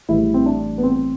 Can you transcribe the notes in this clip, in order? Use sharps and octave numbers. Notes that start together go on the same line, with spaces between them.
A1 A2 E3 G3 E4
C4
D4
B3
C4